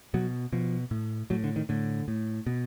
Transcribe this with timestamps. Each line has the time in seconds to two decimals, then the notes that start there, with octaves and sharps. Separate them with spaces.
0.14 B2 F#3
0.53 B2 F3
0.91 A2
1.30 A2 F#3
1.44 D3
1.56 D#3
1.69 A2 D3
2.08 A2
2.47 B2